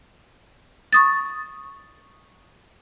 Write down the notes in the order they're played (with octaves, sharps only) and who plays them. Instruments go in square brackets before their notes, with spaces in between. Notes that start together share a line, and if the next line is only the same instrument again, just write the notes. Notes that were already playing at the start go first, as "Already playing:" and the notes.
[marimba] C#6 D#6 A6